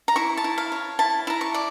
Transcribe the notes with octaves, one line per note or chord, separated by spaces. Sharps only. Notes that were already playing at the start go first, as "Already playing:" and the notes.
A#5
E4 C#6
A5
E4
F5
C#5
E4 A5
E4 A#5
C#6
D5